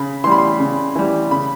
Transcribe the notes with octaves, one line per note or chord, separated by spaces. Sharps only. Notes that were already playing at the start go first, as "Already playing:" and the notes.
Already playing: C#3 B5
E3 G3 B5 C6
C6
C#3
E3 G3
C#3 B5